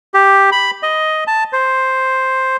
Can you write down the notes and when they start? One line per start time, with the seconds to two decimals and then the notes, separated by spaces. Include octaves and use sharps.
0.14 G4
0.52 B5
0.83 D#5
1.27 A5
1.53 C5